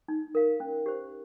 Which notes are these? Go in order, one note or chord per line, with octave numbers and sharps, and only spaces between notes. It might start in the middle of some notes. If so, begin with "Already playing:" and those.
D#4
A#4 F5
C#4
G4 C5